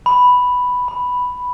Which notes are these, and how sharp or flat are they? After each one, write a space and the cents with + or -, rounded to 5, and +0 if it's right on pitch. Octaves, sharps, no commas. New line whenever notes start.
B5 +0
B5 -5